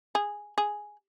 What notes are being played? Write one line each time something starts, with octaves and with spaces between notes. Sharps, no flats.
G#4
G#4